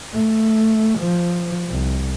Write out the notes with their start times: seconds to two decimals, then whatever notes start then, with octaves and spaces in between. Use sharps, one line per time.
0.13 A3
0.99 F3
1.68 C2